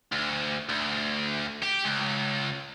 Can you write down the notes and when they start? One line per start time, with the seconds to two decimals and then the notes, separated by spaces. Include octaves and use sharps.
0.12 D2
0.69 D2
1.63 G4
1.86 C#2